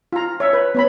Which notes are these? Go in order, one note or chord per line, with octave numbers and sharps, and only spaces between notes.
F4 A#5
C#5 E5
B4
B3 C#5 B5